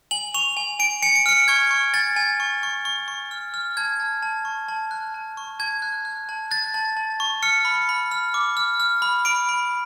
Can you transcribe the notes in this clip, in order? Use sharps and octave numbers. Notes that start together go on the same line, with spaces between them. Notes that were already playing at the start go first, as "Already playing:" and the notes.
G#5 F#7
C#6 F7
G#5
G#5 D7
G#5 C#7
D7
F6 C#7
C#6 G#6
C#6
G#5 A6
G#5
C#6
C#6
C#6
C#6
F6
F6
A5 G#6
A5
A5
C#6
A5
F#6
A5
C#6
A5 G#6
F#6
F#6
A5
F#6 A6
A5
A5
C#6
F6 C#7
B5
B5
F6
D6
F6
F6
B5
B5 D7
B5